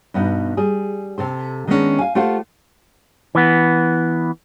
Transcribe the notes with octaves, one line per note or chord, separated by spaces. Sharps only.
G2 B2 B3 D#4
G3 G#4
C3 A4 C5
D#3 G#3 A#3 B3 C#4 D4
F5 G#5
A3 F4 G4 C5 F5 F#5
E3 B3